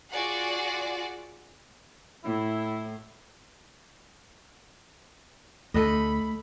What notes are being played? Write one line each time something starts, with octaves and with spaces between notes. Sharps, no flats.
F4 F#4 G#4 D5 F#5
A2 E4
D2 A3 A4 D#5 B5